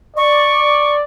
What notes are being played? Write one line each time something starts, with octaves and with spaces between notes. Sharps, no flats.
D5 C#6